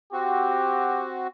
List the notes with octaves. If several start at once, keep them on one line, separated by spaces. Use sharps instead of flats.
C4 F#4 G4